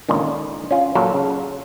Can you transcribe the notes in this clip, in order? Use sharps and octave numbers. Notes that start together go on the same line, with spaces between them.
C#2 A#2 D3 D#3
C#4 F4
A#2 F#3 A4 F5
C#3